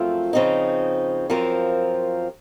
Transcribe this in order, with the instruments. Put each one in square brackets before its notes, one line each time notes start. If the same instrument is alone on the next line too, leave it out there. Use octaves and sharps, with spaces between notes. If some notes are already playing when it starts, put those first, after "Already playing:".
Already playing: [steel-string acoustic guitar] F#2 F3 A3 C4 F4
C#3 F3 C4 D#4
F#2 F3 C4 F4 A#4